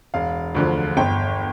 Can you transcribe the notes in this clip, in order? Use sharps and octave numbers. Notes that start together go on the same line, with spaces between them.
E1 F5
D2 D3 F3
G1 G5